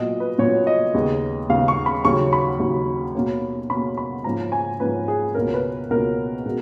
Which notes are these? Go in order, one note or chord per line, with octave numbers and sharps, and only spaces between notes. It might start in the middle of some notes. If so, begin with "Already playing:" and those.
Already playing: A#2 F#3 B3 D#5
B4
A#2 F#3 B3 C#5
D#5
D#2 C#3 G#3 B3
D#2 C#3 G#3 B3 F5
C#6
B5
D#2 C#3 F#3 C#4 C#6
B5
D#2 C#3 F#3 C#4
B2 A#3 C#4
B2 A#3 C#4 B5
B5
G#2 F3 A#3 C#4 A#5
G#5
G#2 F3 A#3 C#4 B4
G#4
C#2 B2 A#3 C#4 A#4
B4
C#2 B2 A#3 C#4 A#4
B2 G#3